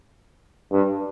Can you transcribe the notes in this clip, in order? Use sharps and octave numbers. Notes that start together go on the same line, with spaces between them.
G2